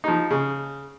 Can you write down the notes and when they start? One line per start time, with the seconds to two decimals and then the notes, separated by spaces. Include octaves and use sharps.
0.04 F3 D#4
0.30 C#3